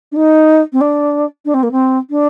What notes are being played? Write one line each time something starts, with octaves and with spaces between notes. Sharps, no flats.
D4
D#4
C4
D4
D4
C4
A#3
C4
D4